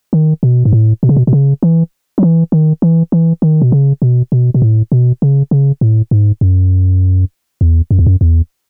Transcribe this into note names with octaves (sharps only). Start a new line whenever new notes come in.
D#3
B2
G#2
A2
B2
C#3
B2
B2
C#3
E3
F#3
E3
D#3
E3
E3
D#3
B2
C#3
B2
B2
B2
A2
B2
C#3
C#3
A2
G#2
F#2
E2
F#2
E2
F#2
E2